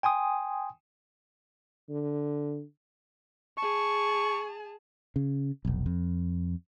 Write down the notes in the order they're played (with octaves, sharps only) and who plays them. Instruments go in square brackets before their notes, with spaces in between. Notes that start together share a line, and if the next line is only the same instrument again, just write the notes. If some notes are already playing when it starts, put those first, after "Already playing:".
[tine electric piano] G5 G#5 C6 D#6
[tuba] D3
[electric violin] G#4 A5 [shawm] C#6
[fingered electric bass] C#3
F1 B1
F2